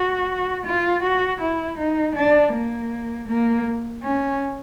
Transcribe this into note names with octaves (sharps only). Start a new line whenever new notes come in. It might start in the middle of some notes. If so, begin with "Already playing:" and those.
Already playing: F#4
F4
F#4
E4
D#4
D4
A#3
A#3
C#4